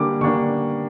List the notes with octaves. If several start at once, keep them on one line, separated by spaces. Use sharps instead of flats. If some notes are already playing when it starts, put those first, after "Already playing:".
Already playing: D3 G3 A#3 D4 D6
D3 G3 A#3 D4 C#6